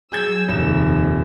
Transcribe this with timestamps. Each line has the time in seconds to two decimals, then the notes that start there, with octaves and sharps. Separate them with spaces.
0.12 F#3 G#4 E6 G6 G#6
0.48 D#1 F2 C3 D#3 E7